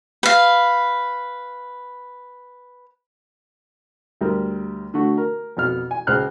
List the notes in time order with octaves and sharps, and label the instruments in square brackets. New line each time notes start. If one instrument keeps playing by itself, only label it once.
[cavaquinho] B4 F5
[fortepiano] D2 G3 A#4
D3 A3 F#4
A#4
F2 B2 F6
G#5
C#2 G#3 C5 F6 F#6